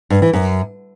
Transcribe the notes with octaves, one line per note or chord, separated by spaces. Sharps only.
G2
E3
F#2